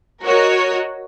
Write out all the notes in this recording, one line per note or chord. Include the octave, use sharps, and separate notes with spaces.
F#4 A#4 C#5 D#5